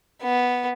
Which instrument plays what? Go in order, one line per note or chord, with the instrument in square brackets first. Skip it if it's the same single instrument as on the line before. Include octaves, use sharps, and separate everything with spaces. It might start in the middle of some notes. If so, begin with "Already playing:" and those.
[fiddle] B3